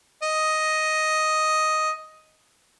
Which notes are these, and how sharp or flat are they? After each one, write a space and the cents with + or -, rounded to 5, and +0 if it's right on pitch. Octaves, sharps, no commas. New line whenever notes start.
D#5 +5